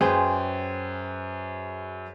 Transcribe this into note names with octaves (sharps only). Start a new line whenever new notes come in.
F#2 G#4 B4 C5 G5